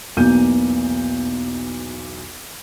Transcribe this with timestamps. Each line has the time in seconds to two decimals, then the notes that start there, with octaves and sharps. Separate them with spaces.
0.17 B1 E2 B2 A#3 G6 D#7